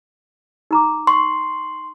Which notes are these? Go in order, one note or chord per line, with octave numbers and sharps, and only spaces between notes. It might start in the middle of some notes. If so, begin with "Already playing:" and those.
D#4 A#5 D6
C6 C#6